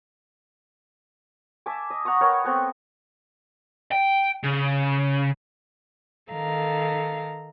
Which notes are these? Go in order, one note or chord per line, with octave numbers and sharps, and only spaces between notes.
E5 G#5 A5 D6
D#5
F#5 A#5 C#6 D#6
A#4 B4 C#5 G5
A3 B3 C4
G5
C#3
D#3 A4 F5 A#5